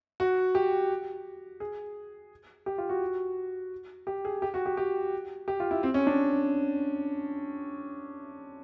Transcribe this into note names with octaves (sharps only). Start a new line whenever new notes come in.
F#4
G4
G#4
G4
F4
F#4
G4
G#4
G4
F#4
G4
G4
G4
F4
E4
C4
C#4
D4